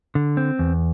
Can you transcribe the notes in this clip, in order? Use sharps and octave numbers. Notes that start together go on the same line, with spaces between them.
D3
C4
E2